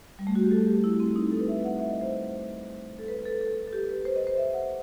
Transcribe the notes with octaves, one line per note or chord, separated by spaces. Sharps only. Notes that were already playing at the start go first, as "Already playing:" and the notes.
G3
A3
F#4
G4
A4
G4
E4
C4
D#4
A4
B4
E5
F#5
E5
D#5
C5
A4
B4
A4
A4
A4
G4
B4
C5
D#5
C5
E5
F#5